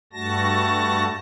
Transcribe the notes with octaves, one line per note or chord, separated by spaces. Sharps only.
G2 G3 A3 F#4 A5 A#6